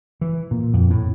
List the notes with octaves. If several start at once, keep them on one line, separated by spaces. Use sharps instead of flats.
E3
A#2
F2
A2